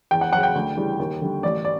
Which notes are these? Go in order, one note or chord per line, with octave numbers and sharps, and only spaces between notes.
E2 G5
F#5
C#3 F#3 F#5
G5
D2
C#3 E3 G3
D#2
D3 G3
A1 D5
D5